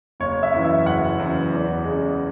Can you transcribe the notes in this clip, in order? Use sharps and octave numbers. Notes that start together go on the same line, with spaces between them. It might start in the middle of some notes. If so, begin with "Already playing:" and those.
F#1 C#5
E5
F#2 E3
E5
F#1 F#5
F#2 E3
E2
C#3 G#3